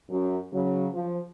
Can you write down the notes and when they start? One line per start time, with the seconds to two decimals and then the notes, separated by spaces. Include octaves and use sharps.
0.10 F#2
0.53 C#3 F#3
0.93 F3